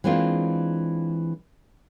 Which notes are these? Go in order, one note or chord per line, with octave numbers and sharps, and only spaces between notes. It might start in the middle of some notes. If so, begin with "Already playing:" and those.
E3 G#3 A#3 C4 D4 F4